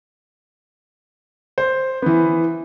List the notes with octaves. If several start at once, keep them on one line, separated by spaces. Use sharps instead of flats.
C5
E3 B3